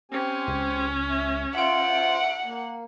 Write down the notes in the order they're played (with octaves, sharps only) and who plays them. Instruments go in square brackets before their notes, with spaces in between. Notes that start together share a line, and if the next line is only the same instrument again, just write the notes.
[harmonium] C4 G4 G#5 [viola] C#4
[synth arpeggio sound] C#2
[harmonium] E5
[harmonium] F4 C5 [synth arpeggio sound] E5 D7 [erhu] F#5
[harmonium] A#3